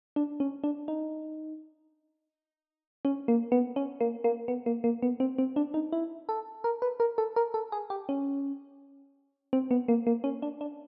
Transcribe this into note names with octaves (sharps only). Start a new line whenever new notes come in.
D4
C#4
D4
D#4
C#4
A#3
B3
C#4
A#3
A#3
B3
A#3
A#3
B3
C4
C4
D4
D#4
E4
A4
A#4
B4
A#4
A4
A#4
A4
G#4
G4
C#4
C4
B3
A#3
A#3
C#4
D4
D4